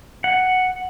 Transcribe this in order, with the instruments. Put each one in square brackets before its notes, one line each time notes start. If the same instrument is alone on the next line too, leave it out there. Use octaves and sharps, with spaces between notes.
[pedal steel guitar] F#5